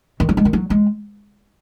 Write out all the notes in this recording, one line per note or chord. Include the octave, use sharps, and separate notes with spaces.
D#3
F#3
G#3
D#3
F#3
G#3